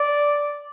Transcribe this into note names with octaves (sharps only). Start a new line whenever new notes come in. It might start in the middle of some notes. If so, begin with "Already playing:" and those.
Already playing: D5